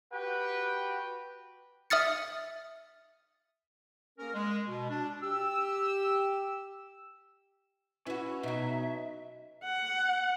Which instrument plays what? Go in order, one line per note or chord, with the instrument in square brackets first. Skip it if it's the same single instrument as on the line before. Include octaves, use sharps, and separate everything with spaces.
[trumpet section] F#4 G4 B4 F#5 G5
[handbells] E5 D#6 F6 A6 C#7
[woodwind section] A#3 C#4 G#4 A#4
G#3
B2
D4
G4 E6
[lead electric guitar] C#4 [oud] E4 F#4 [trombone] B4
[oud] B2 F#3 [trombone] D#4 [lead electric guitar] E5
[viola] F#5